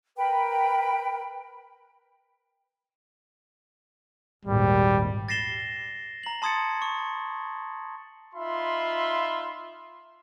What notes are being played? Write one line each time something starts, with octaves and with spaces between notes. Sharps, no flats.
A#4 B4 G5 B5
G#1 D#2 A#2 G3
A6 A#6 C7 E7 G7
A#5 F#7
A5 C6 D#6 G#6 A6 C#7
C#6
D#4 F4 E5 B5 C6